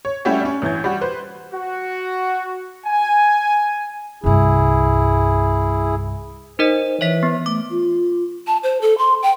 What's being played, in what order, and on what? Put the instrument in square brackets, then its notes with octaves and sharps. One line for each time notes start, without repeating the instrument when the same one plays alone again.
[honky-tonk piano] C#5
G3 A3 C#4 E4 F#4 G4
C#4 D4
A1 E3 G6 G#6
G3 F#4
B4 C5
[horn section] F#4
G#5
[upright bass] C2 G2 [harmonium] E4 G#4
[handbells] D#4 A#4 D#5 [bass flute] C5
[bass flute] E3 [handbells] C#5 E5 B6
[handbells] B3
[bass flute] A3 [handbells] D6
[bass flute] F4
[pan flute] A5
C5
A4
C6
G5